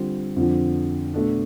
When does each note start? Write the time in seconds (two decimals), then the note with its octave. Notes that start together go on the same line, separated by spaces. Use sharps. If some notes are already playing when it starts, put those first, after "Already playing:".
Already playing: D3 G3 C4 F4
0.36 F2 D3 F3
1.14 B2 A3 D4